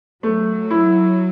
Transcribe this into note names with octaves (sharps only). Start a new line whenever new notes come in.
F#3 A3
E4